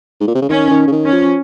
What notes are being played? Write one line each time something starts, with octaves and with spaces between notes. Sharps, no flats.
G#2
A#2
C3
C#3
D#3 C#4
D#3
C#3
D#3
C#4
F3